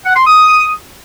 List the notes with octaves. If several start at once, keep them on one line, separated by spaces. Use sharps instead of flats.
F#5
C6
D#6